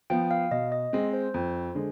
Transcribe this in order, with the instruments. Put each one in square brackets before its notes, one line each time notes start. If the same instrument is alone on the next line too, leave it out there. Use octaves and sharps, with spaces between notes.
[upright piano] F3 B3 [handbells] G5
[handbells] F5
[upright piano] B2 [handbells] D#5
[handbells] D#5
[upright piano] G#3 C4
[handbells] C5
[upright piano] F2
D3 G#3